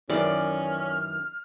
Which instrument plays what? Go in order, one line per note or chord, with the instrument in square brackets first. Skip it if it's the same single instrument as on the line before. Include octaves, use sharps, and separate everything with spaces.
[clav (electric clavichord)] F#2 D#3 E3 [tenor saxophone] C#4 [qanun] D5 [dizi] F6